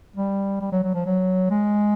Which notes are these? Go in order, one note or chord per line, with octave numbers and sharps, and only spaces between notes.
G3
G3
F#3
F#3
F3
F#3
G#3